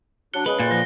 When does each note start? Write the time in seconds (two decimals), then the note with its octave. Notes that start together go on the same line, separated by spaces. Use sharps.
0.34 F#3 D4 F#6 C#7 G7
0.46 C#3 G#3 G#4 B4 G7
0.60 F#2 A#2 C#3 F4
0.71 D3 F3 F#6 A#6